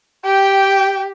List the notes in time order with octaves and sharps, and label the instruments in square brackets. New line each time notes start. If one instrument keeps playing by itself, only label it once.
[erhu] G4 [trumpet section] G5